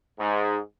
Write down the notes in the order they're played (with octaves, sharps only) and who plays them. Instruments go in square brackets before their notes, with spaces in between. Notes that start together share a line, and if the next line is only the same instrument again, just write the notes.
[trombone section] G#2